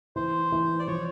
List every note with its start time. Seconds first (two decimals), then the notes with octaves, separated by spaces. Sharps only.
0.16 E3 C5
0.52 E3
0.79 D5
0.87 F3 C#5